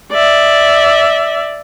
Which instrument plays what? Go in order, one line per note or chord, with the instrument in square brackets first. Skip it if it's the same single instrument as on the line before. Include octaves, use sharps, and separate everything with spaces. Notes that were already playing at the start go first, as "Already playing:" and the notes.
[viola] D5 E5